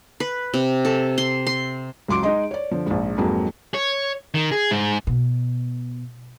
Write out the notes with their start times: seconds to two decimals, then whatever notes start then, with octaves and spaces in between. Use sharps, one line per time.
0.20 B4
0.54 C3
0.85 A4
1.18 C6
1.47 C6
2.08 C#2 F#3 C6 D6 D7
2.23 G#3 D#4 G#4 D#5 C6
2.51 C#5 D5
2.71 D3 F3
2.86 A#1 G#2
3.18 F2 G#2 F#3 G#3 A#3
3.74 C#5
4.34 D#3
4.52 G#4
4.71 G#2
5.07 B2